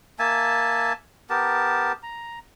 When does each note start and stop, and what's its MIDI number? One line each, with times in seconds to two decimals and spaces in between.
0.19 0.93 58
0.19 0.93 76
0.19 0.93 80
0.19 0.93 81
1.30 1.92 59
1.30 1.92 67
1.30 1.92 70
1.30 1.92 81
2.03 2.39 82